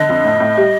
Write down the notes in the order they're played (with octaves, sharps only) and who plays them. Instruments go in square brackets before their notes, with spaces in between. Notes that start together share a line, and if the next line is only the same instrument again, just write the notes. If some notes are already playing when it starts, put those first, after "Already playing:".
Already playing: [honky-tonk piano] D3 [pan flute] D#5
[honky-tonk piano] F2
A2
A2
G3